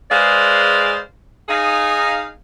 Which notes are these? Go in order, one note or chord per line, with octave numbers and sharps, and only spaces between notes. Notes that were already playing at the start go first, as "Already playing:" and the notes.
G#3 G#4 B4 C5 D5 F5
D#4 G#4 F5